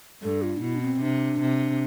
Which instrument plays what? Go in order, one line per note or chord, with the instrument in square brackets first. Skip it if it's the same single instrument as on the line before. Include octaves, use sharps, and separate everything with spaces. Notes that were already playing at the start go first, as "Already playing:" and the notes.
[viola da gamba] G2 [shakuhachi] A4
[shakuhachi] F4
D4
[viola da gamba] B2 [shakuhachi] E4
[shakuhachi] D4
C4
[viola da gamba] C3 [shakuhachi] D4
[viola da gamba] C3